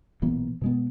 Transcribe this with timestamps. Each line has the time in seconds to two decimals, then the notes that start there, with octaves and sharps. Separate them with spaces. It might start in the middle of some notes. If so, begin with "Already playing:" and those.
0.22 B1 A#2 E3 B3
0.62 B2 G#3 B3